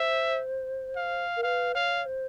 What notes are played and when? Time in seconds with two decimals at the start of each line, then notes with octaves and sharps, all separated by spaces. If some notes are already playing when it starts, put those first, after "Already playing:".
Already playing: C5 E5
0.96 F5
1.37 A#4
1.43 B4 F5
1.75 C#5 F5
2.05 C5